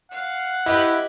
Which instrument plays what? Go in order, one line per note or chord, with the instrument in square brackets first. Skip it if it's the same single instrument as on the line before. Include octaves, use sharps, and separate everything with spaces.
[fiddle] F5 [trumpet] F#5
[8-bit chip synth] E4 [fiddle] G4 B4 [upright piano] D#5